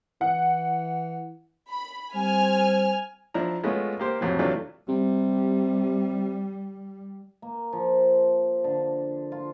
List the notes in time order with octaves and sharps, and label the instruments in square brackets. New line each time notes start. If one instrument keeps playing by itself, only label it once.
[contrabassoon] E3 [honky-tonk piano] F#5
[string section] B5
[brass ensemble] G3 C4 C5 [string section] G#5 F6
[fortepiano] F3 D4 E4 A#5
G#3 A3 B3 C#4 F4
A#3 G4 C5
F2 A2 C3 F#3
C3 E3 F#3 A3 D4 F4
[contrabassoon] C3 [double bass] G3
[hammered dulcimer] A#3
F3
D3
F4